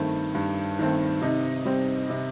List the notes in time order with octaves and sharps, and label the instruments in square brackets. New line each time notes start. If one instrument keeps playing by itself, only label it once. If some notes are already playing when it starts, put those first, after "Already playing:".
Already playing: [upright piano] G2 D#3 A3 C4
G2
D#3 A3 C4
C3 D#4
G3 C4
C3